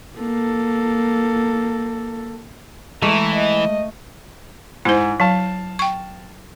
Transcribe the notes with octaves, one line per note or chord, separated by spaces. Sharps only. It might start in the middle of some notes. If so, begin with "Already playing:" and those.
A#3 A4
E3 G#3 A3 A#5
D#5
G#2 E4 C5
F#3 F5 A5
G5 C#6